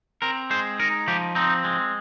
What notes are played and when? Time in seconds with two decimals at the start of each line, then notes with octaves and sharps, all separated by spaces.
0.22 C4 A#4
0.50 G#3 C5
0.79 D#4 A#4
1.08 F3 G4
1.35 C4 D#4
1.64 G#3